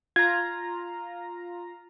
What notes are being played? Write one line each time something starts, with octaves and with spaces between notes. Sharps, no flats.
F4 A#5 G#6